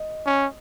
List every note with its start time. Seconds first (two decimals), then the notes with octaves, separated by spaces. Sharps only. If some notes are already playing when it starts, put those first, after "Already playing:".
Already playing: D#5
0.26 C#4